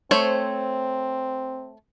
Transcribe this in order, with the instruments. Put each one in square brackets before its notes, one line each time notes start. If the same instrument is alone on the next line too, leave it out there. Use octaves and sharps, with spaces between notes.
[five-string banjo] A3 C5 C#5 [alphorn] C4